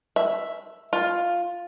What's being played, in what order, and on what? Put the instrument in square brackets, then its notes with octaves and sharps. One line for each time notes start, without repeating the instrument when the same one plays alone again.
[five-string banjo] E5
F4